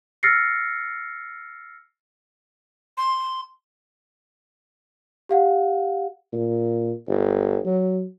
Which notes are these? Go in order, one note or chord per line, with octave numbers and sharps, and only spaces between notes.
E6 F6 A6 A#6 C7 C#7
C6
G4 F5 F#5
A#2
G1
F#3